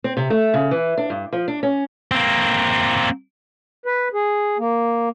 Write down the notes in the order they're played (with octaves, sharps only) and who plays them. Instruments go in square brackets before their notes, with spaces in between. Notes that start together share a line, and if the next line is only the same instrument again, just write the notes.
[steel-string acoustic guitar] C4
C3
A3
C#3
E3
D4
G2
F3
D4
C#4
[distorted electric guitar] A#3 C4
[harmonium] B4
G#4
A#3